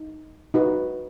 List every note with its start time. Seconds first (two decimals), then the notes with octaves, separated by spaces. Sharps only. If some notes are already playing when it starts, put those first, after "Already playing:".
Already playing: D#4
0.54 D#4 F#4 B4